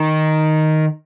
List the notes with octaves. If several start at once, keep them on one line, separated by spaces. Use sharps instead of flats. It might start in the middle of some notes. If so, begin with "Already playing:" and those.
Already playing: D#3